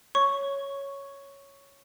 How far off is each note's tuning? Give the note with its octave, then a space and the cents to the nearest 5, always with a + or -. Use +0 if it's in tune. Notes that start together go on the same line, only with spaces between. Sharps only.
C#5 +0 C#6 +0